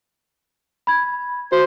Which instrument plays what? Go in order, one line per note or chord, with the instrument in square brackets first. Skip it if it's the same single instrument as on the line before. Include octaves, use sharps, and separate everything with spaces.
[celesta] B5 G#6
[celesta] F#4 [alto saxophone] C5